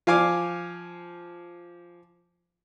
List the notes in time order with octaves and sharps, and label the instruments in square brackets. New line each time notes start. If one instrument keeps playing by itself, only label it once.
[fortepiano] F3 F5 G#5 D6